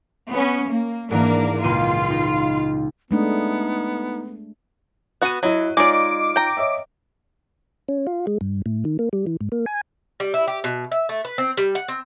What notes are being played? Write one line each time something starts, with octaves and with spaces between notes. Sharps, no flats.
B3 C#4
A#3
G#2 E3 A#3 D4 A#4
C#2 A#2 F4 D#7
D#4
G#3 A3 B3 D4 D#4
B3 F#4 F#6 D#7
F#3 E4 D#5
G#3 D#4 F4 C#5 D5 D6 D7
G5 A#5
C#5 D#5 E5
C#4
F4
G#3
G2
A2
D#3
A#3
G3
E3
G#2
A#3
G#5
G3
E4
G4
B2
E5
A3
B4
C4
G3
F#5
C4